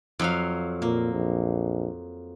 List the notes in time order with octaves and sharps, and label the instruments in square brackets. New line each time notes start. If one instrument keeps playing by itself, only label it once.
[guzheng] F2 F#3 F5
[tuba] A#2 [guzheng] A#3
[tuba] A#1